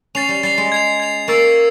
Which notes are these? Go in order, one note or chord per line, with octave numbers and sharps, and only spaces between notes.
C#4 A6 C7 F7
G3
G3 A6 C7 F7
G#3
G#6 C7 F7
G#6 C7 F7
A#3 C#6 E6 A6 C7